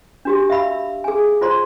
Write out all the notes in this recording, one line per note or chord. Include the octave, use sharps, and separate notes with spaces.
D4 F#4 G4
E5 F5 B5 E6
G#4 G#5
F4 C5 D5 C6